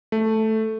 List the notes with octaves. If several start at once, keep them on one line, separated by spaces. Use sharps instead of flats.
A3